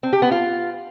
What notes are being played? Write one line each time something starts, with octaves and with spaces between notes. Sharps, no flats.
C4
G4
B3
F4